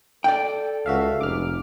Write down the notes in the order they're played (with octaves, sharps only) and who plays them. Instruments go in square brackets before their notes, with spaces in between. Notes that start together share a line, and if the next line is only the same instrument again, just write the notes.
[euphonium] A4 [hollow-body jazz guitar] D5 G5
[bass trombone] C#2 [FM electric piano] F#4 E5 F5
[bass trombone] F1 [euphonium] G#2 [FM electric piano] D6 F6